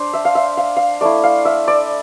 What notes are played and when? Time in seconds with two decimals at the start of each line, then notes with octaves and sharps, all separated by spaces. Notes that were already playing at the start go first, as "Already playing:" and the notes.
Already playing: D4 C5
0.14 E5
0.25 F5
0.35 E5
0.57 F5
0.77 F5
1.01 A3 E4 D5
1.24 F5
1.45 E5
1.68 D5